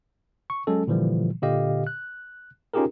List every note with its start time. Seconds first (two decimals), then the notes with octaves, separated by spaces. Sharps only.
0.50 C#6
0.67 F#3 G#3 C#4 A4
0.87 A#2 D3 E3 F3 G3
1.42 A#2 D3 G4 D#5 F5
1.87 F#6
2.74 C#4 D#4 F4 G4 G#4 A#4